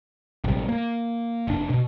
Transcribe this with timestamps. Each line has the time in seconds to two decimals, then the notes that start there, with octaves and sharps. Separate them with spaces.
0.44 A#1 C3 G3
0.69 A#3
1.48 F1 D4
1.70 B2